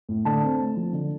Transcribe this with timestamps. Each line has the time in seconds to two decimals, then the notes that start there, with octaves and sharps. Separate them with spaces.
0.09 A2
0.25 D3 A5
0.42 C4
0.59 A3
0.77 F3
0.93 D3